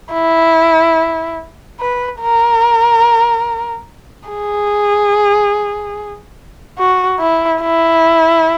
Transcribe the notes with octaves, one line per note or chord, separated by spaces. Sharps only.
E4
B4
A#4
G#4
F#4
E4
E4